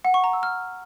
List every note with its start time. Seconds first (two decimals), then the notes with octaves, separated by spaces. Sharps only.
0.05 F#5
0.14 C#6
0.24 A#5
0.33 E6
0.43 F6